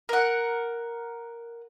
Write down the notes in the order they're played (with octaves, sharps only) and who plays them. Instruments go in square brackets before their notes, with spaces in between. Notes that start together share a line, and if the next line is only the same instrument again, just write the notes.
[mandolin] A#4 F#5